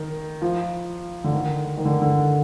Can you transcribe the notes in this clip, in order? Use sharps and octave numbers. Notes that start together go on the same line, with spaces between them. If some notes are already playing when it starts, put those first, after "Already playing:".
Already playing: D#3
F3
D3
D#3
D#3
D3
D3